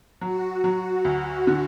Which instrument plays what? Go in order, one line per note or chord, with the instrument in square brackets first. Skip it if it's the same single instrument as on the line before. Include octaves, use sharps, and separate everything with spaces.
[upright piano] F#3 [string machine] F#4
[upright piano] F#3
D2
D3